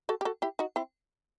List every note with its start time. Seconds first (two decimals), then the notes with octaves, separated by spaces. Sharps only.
0.09 F#4 A4
0.21 G4
0.25 F#4 A4
0.42 E4 G4
0.59 D#4 F#4
0.76 C4 E4